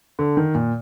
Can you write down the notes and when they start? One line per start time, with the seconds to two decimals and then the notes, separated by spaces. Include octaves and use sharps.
0.19 D3
0.37 D#3
0.55 A#2